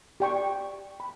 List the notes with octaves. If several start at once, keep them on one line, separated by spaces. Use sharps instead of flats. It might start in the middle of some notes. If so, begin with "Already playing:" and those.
G4 D5 G5 C#6
B5